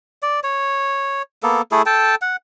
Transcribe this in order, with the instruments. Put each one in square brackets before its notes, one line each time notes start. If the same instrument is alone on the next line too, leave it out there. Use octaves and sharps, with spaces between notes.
[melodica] D5
C#5
A#3 B3 A4
A3 E4 G#4 A4
A4 G5 A5
F#5